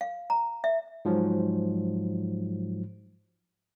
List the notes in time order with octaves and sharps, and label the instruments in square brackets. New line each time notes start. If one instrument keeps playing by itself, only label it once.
[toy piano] F5
A#5
E5
[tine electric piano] G#2 F3 F#3